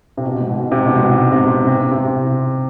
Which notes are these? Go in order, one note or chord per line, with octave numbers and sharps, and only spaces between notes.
C3
B2
G#2
B2
B2
C3
B2
G#2
C3
C3
C3